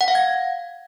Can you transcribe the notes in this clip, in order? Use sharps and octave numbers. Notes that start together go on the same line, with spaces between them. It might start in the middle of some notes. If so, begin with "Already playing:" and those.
F#5
F5
G#6